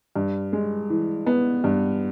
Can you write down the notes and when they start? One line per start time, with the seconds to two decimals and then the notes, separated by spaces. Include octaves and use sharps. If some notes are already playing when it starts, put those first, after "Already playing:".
0.16 G2
0.53 G#3
0.90 E3
1.26 B3
1.64 G2